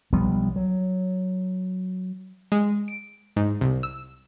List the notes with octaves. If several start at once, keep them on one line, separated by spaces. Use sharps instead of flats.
B1 F3 G3 B3
F#3
G#3
D7
G#2
C2
E6